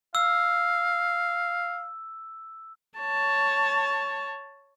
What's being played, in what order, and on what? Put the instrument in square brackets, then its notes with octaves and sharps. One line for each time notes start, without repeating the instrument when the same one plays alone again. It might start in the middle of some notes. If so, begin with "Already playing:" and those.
[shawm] F5 [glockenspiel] E6
[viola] C#5 A5